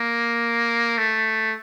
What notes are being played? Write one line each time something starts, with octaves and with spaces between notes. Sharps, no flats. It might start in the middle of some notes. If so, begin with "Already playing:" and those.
Already playing: A#3
A3